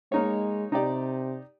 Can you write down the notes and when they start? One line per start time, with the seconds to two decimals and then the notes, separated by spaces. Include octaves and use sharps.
0.12 G#3 A#3 D#4 C#5
0.72 C3 D#4 G4 D5